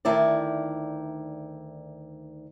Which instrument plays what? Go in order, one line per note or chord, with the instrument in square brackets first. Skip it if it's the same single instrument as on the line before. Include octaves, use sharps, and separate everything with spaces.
[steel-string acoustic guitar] D2 D#3 E4 D5